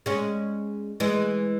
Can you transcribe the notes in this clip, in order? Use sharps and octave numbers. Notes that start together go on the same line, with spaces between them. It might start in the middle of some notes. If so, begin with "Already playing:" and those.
G#3 C#4
E3 G#3